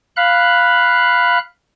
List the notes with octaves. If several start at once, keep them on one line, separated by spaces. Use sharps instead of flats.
F5 B5 F#6